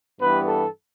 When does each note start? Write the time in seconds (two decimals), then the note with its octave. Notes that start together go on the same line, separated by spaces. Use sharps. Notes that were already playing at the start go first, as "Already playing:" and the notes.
0.19 G2 E3 G3 B3 B4
0.47 A4